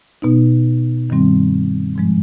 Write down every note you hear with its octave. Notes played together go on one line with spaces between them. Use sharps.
B2 B3 D#4
G2 D#3 G3 C4
G#2 F3 G#3